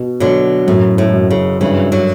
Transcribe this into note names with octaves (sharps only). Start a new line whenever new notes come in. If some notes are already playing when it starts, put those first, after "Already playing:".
Already playing: B2
B2 D3 F#3
F#2 A2
A2
F#2
C#3
G2 C#3 E3
D3 F#3